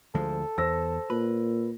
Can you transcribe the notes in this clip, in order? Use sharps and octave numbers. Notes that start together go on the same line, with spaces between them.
D2 F3 G#3 A4
E2 C5 E6 A#6
A#2 B4